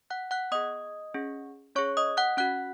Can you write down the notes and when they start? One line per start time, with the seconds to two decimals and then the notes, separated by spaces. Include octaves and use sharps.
0.10 F#5 F#6
0.31 F#5 F#6
0.51 B3 G#4 D#5 D#6
1.14 C#4 G#4
1.75 C#4 G#4 C#5 C#6
1.97 D#5 D#6
2.17 F#5 F#6
2.37 C#4 F#4 F#5 F#6